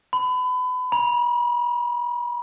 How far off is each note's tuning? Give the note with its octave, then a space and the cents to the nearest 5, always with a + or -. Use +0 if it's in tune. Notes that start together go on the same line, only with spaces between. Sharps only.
B5 +30
B5 -45